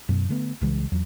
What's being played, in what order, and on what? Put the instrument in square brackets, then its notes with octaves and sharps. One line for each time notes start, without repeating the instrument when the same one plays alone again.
[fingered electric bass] F#2 B2
D3 A3 B3
C2 C#3 E3 G#3
E2 F#3